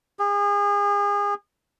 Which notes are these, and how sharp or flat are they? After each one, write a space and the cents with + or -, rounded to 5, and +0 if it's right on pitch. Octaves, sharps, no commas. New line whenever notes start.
G#4 -35